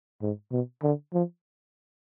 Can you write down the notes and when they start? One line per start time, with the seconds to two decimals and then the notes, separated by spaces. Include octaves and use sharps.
0.22 G#2
0.52 B2
0.83 D3
1.13 F3